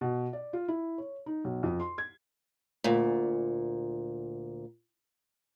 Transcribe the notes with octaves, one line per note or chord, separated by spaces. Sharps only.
B2
D5
F4
E4
C#5
D#4
B1
F2
C6
G#6
D2 A#2